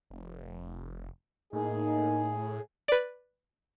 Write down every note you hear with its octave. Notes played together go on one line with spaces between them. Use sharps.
F1
A2 A#3 D#4 G#4
B4 D5